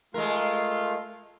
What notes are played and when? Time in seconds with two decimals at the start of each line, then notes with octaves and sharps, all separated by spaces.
0.14 G#3 A3 F4 A#4 F5